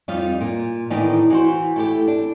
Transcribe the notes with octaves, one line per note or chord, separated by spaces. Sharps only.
F2 G3 D#4 F4 F5
A#2
A2 D#3 E3 B3 D4 D#4
E3 F#4 C5
A3 E4 G4
D4